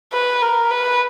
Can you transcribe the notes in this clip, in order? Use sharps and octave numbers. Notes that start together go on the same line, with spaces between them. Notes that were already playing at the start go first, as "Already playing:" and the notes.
B4
A#4
B4